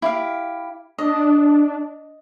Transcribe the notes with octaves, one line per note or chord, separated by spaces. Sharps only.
E4 G4 F5
D4 D#5